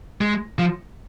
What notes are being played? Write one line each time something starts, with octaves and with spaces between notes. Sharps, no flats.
G#3
F3